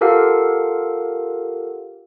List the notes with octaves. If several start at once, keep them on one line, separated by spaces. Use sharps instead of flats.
F4 G4 A4 A#4 F5 F#5